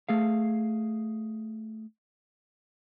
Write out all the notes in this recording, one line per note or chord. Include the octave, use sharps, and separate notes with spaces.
A3 G#4 F5